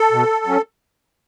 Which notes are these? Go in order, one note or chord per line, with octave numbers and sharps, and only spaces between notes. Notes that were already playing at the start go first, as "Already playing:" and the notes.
Already playing: A4
B2
F#3 C#4